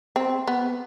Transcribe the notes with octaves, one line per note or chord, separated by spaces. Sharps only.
C4
B3